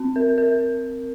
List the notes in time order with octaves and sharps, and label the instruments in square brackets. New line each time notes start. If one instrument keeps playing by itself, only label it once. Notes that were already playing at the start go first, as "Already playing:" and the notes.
Already playing: [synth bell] C4
A#4
A#4